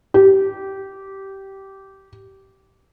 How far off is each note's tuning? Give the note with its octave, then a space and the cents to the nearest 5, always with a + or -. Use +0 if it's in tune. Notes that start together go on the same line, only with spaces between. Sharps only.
G4 -15